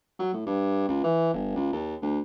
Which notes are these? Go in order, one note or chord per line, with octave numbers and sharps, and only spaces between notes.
F#3
A2
G2
C#2
E3
G1
C#2
D#2
D2